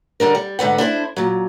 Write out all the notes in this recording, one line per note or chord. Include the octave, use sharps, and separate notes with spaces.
D3 G3 D4 A#4
G3
G#2 D3 B4 F#5
D4 E4 A4 C5
A#2 F#3